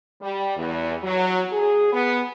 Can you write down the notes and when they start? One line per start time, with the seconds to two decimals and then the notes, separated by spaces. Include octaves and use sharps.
0.21 G3
0.56 E2
1.03 F#3
1.53 G#4
1.93 B3